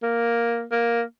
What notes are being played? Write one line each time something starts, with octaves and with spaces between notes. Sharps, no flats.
A#3
A#3